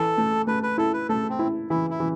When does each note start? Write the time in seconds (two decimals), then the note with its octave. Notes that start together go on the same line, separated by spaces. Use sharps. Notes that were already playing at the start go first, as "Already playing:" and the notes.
Already playing: E3 A4
0.18 A3
0.47 A3 B4
0.63 B4
0.78 E4 A4
0.93 B4
1.09 A3 A4
1.30 C4
1.39 E4
1.70 E3 E4
1.90 E4
2.00 E3